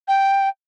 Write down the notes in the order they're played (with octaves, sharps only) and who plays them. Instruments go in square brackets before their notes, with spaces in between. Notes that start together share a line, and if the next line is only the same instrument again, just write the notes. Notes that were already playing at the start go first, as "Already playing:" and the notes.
[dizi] G5